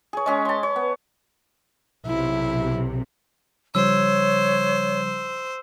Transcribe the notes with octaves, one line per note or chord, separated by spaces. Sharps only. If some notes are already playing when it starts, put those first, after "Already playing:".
G#4 C#5
G#3 C#4 G#4
A5 C6
C#5
B3
B1 C3 E4
C#3 F3 G3 C5 C#5 E6